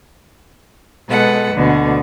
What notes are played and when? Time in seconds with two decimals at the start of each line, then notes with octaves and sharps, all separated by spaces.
1.07 B2 G#3 A4 B4 F#5
1.53 D2 B2 D3